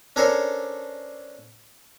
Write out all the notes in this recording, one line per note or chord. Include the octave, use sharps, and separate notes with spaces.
C#4 D4 A4 A#4 C5 C#5